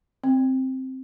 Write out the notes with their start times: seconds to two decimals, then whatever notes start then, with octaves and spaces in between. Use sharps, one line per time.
0.24 C4